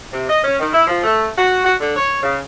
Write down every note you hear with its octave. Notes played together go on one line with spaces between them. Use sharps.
C3
D#5
C#4
D#3
E4
F3
A3
F#4
F#4
D3
C#5
C#3